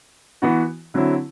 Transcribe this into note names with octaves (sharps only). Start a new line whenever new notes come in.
E3 B3 F#4
D3 F#3 C4 E4